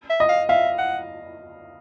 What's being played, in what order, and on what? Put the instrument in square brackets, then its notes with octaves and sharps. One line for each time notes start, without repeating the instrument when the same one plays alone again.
[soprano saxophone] E5
[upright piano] D#5
[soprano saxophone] F5
[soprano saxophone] E5 [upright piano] F5
[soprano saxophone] F#5